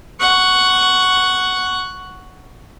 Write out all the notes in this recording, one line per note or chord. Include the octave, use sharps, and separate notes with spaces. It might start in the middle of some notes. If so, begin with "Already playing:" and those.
F#5 C#6